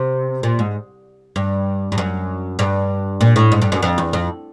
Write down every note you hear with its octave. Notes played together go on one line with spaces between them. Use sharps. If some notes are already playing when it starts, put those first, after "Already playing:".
Already playing: C3
A#2
G#2
G2
G2
F#2
G2
A#2
A2
G#2
G2
F#2
F2
E2
F2